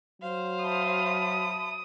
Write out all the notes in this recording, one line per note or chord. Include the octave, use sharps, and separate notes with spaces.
F#3 C5 F5
E5 A5 B5 D#6